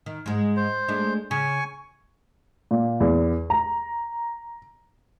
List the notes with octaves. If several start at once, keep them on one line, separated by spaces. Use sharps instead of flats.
D#3
G#2 G#3
C5
G#3 A3 D4
C#3 G#5 C#6
A#2
E2
A#5